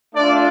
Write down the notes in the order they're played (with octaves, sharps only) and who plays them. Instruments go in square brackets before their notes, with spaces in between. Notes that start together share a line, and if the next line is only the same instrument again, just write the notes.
[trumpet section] A3 D4 F4 D5